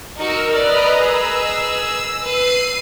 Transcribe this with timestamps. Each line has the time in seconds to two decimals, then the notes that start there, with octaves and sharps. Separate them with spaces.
0.17 D#4 F#4 A#4 E6
0.54 B4 D5 D#5 A#5
0.99 G#4 E6
2.22 B4 C7 D#7